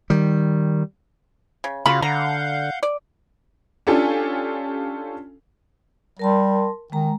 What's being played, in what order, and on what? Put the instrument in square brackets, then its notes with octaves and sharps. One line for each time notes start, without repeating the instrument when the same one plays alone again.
[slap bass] D#3 G3
[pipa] C#3
[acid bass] C#3 [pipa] F4 [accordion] F#4 [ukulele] B5
[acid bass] D3 [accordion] F5 F#5 G6 [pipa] A#5
[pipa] D5
[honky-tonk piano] C#4 D4 F4 G4 A4 G#5
[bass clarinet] G3 [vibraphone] A#4 A5 C6
[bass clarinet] D#3 [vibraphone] G#3 A#5